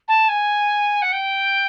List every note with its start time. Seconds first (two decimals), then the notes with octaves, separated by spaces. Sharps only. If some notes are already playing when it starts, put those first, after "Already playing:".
0.08 A5
0.29 G#5
1.02 F#5
1.12 G5